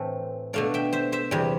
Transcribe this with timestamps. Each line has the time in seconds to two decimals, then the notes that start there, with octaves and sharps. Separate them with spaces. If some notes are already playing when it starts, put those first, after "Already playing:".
Already playing: A2 E3 A3 C4
0.53 B2 A3 D4 D5 F5
0.74 E5 G5
0.93 C5 E5
1.12 C5 E5
1.31 E2 C3 G3